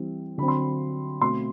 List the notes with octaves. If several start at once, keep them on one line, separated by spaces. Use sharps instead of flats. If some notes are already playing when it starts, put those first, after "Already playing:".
Already playing: E3 G3 C4
D3 F#3 C4 B5
C6
B5
B2 A3 C4 C6